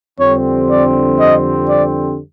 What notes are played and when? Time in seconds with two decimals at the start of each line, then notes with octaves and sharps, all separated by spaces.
0.19 F2 D3 G3 C4 C#5
0.70 D5
1.20 D#5
1.69 D5